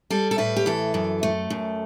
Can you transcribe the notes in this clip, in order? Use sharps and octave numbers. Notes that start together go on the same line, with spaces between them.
G3 A4
A4
A2 B4
G4
E3 A4
F#2
A3
F#2